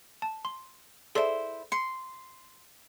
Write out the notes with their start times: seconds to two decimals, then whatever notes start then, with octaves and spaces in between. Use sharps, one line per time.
0.22 A5
0.45 C6
1.15 E4 G#4 A4 C5 D5
1.72 C6 C#7